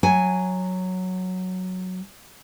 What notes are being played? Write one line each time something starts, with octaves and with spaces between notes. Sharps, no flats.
F#3 G#5